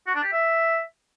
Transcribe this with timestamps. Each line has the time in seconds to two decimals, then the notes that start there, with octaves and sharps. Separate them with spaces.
0.07 F#4
0.15 D4
0.24 G4
0.32 E5